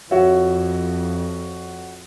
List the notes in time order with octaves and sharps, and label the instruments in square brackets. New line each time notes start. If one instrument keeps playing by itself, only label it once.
[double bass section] F2 [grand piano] F#4 C#5 E5